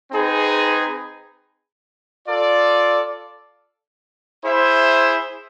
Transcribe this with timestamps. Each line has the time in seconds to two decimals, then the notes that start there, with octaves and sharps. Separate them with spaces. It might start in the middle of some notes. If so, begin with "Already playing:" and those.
0.12 C4 D#4 G#4 B4
2.26 F4 A4 D5
4.42 E4 G#4 C5 E5